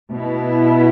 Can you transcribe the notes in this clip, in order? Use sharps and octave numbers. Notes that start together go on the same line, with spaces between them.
B2 B3 E4